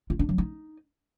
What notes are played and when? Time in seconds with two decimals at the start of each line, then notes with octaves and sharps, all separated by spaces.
0.10 F4
0.19 D4
0.29 F#3
0.38 D#4